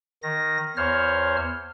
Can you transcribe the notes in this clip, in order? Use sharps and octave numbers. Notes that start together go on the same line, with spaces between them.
D#3 A#6
E2 C5 C#5 F6